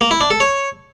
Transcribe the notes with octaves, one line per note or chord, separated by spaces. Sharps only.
A#3
E4
D4
A4
C#5